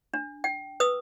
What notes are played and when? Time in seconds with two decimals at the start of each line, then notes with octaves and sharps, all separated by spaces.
0.14 D4
0.44 G5
0.80 B4 D#6 E6